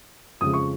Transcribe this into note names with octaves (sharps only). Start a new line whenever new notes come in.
F2 C#3 G#3 D#6
C#6